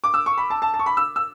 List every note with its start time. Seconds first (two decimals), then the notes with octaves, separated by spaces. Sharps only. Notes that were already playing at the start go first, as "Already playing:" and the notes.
0.04 D6
0.14 E6
0.26 C#6
0.38 B5
0.50 A5
0.62 A5
0.74 A5
0.79 C#6
0.86 B5
0.97 E6
1.16 E6